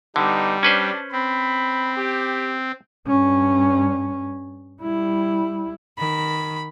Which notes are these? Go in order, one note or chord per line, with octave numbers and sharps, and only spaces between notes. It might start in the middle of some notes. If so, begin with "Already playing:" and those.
D3 G3 B3 D#4
C#4 D4 B4 C5
C4 B5
G4
G2 C#4
G3 E4
D#3 B5